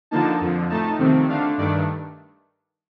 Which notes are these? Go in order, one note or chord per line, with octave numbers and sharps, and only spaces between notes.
D3 F3 A#3 D#4 A5
F2 D3 F3
A2 A3 D#4 A5
F2 C3 D#3 A3 C4
D3 A3 D4 F5
G2 D#3 A3 D4 D5